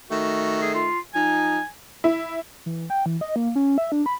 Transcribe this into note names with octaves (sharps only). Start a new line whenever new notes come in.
D#3 A3 F#4
G#4
F4
F3 D#4 G#5
E4
E3
G5
E3
D#5
A#3
C#4
E5
D4
B5